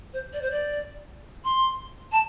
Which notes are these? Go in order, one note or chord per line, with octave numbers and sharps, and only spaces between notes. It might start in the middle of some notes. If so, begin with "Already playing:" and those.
C5
D5
C5
D5
C6
A5